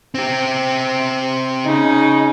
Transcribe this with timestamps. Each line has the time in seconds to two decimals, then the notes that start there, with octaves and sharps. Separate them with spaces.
0.15 C4 G4
1.66 C#3 D#4